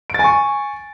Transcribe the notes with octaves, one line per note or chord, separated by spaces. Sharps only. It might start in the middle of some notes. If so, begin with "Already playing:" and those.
G#5 C#6 A6 D7